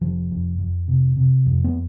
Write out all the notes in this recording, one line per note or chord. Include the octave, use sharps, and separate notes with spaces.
F1 F3
F2
F2
C3
C3
F2
B3